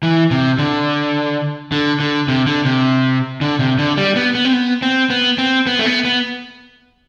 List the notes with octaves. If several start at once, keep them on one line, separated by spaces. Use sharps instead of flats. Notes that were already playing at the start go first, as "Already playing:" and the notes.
E3
C3
D3
D3
D3
C3
D3
C3
D3
C3
D3
G3
B3
B3
C4
B3
C4
B3
C4
B3
A3
B3
B3